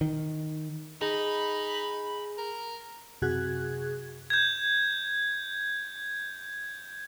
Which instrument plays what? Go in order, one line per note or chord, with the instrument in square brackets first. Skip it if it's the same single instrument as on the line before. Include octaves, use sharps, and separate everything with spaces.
[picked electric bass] D#3
[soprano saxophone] D#4 [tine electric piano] G#4 [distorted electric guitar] B5
[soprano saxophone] A#4
[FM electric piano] F#2 C3 F#4 G#4 F#6 G#6
[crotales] G6 G#6